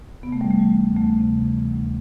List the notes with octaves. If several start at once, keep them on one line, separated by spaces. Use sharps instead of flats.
C3 B3
A3
G3
E3 A3
G3
D2
D2 A3
C3
E3
D2